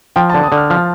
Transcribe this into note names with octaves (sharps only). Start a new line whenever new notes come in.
F3 G5
A5
D3
D#6
D3
F6
F3 F6